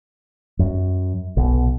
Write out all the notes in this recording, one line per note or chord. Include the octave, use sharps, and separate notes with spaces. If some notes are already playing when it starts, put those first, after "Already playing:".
F#2
B1 B2